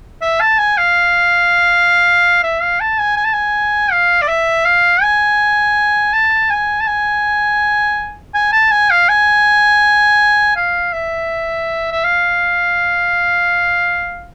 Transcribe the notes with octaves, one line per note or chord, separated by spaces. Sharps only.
E5
A5
G#5
F5
E5
F5
A5
G#5
G#5
A5
G#5
F5
D5
E5
F5
G#5
A5
G#5
A5
G#5
G#5
A5
G#5
F5
G#5
F5
E5
E5
F5